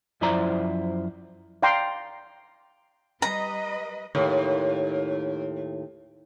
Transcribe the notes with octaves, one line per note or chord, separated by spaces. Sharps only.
F#2 F3 E4 C5 D5 A#5
D5 F5 G5 A#5 C6 D6
G3 B4 D#5 A#5
D#2 A2